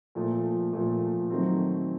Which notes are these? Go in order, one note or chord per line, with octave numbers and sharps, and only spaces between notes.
A#2 F3 A3
A#2 F3 A3
D#3 F#3 A3 C4